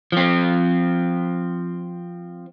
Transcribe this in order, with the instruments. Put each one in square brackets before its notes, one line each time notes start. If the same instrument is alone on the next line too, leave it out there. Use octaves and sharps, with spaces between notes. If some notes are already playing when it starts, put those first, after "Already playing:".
[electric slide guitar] F3 C4